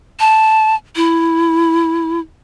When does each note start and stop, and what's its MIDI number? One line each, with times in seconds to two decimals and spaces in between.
0.20 0.75 81
0.96 2.20 64